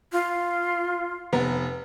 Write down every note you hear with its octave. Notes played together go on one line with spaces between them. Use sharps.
F4
F1 B3 A#5